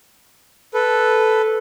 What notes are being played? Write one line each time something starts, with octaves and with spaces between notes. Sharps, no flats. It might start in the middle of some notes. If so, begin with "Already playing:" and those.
A4 B4